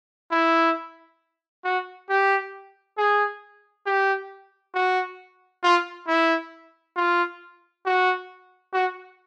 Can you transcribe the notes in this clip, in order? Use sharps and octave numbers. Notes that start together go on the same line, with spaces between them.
E4
F#4
G4
G#4
G4
F#4
F4
E4
F4
F#4
F#4